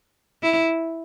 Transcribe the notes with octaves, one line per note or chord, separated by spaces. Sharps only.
E4